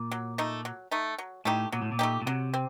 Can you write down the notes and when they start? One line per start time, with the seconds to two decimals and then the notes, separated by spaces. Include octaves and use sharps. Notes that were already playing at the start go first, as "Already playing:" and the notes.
Already playing: A#2
0.11 F#3
0.38 A3 D#4
0.65 F#3
0.91 A3 D#4
1.18 F#3
1.45 A2 A3 D#4 G4
1.72 A#2 F#3
1.82 A2
1.92 A#2
1.99 A3 D#4 G4
2.22 A#2
2.27 C3 F#3
2.54 C4